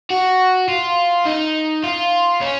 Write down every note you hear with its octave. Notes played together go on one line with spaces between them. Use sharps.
F#4
F4
D#4
F4
C#4